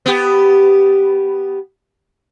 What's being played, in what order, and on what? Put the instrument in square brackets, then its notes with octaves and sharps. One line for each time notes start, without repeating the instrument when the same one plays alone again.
[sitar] B3 G4